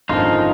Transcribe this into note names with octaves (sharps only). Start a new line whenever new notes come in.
G#1 F#2 D3 F3 D#4 F4